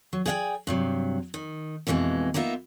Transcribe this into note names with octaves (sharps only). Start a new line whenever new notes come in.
F#3
G#4 D5 E5 F5 G5 G#5
G2 C3 F#3
D#3
F2 B2 E3 G3 G#3
A#3 B3 D#4 F4 E5